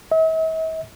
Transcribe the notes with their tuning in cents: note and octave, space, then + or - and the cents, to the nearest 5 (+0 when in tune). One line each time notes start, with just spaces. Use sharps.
E5 -45